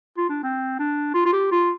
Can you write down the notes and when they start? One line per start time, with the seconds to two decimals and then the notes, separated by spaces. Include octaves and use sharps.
0.17 F4
0.29 D4
0.43 C4
0.79 D4
1.14 F4
1.25 F4
1.32 G4
1.51 F4